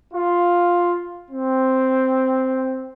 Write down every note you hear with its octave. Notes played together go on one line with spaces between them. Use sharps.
F4
C4